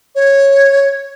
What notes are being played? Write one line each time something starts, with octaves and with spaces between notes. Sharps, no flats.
C#5